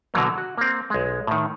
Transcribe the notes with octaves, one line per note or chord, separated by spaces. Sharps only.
B2 D3 E3 F#3 A#3
F#4
A#3 C4
B1 G#3
A2 D#3